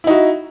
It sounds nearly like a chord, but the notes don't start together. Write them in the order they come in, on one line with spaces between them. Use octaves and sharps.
E4 D#4 F#4